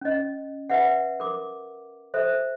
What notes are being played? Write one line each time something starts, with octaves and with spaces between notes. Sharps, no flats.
C#4 D#5
B4 E5 F#5
A#4 D6
A4 C5 E5